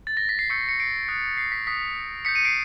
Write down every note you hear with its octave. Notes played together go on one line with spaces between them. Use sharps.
A6
A#6
B6
C7
C#6 E6 G6 B6 C#7
C#7
C7 D7
D#6 F#6
C7
B6
D#6 F#6 B6
D#6 G6 B6 C#7
C#7 D#7
C7 D7